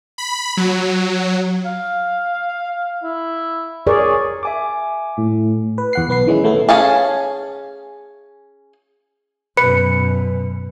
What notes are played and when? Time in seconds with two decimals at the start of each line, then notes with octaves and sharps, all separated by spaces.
0.18 B5
0.57 F#3
1.66 F5
3.03 E4
3.87 G#4 A#4 C#5 D5
4.43 E5 G#5 D6
5.18 A2
5.78 B4
5.93 E2 F#5 C7
6.09 B1 B3 B4 C7
6.27 D#3 E3 G#3 C#4 E4
6.44 A2 A3 B3 A4
6.69 C#4 G#4 F5 A5
9.57 F#2 B2 B4 C#7